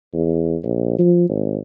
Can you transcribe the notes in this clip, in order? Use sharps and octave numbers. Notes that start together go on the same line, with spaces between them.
E2
A#1
F3
G#1